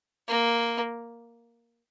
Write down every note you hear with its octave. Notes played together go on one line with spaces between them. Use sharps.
A#3